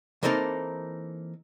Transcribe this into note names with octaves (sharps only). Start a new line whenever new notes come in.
E3 A#3 C4 D#4 A4 A#4